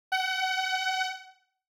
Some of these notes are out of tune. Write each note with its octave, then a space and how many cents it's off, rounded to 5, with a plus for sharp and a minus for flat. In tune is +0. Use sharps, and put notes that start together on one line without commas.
F#5 +30